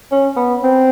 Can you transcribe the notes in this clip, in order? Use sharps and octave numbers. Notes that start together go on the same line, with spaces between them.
C#4
B3
C4